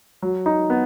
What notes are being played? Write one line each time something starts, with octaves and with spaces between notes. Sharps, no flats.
F#3
D#4
B3